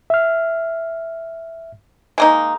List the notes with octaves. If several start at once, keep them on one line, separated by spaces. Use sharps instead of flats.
E5 F6
G#3 A#3 D#4